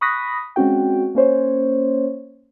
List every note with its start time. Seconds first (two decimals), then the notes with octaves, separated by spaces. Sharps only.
0.01 B5 C#6 D#6 F#6 A#6 B6
0.56 G#3 C4 C#4 F#4 G5
1.15 A#3 C#4 C5 C#5